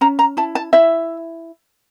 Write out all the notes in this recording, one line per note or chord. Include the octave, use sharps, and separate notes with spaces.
C#4 A#5
A#5
E4 A5
A5
E4 E5